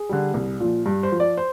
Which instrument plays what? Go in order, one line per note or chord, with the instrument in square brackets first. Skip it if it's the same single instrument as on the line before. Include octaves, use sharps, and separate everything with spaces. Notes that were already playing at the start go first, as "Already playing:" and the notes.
Already playing: [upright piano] G#4
D3 G3
C2
A#2 F3
G2
C5
F3
D5
C5